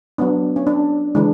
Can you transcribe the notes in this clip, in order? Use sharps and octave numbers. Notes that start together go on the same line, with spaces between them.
F#3 B3 D4
C#4
D4
C#3 E3 G#3 D4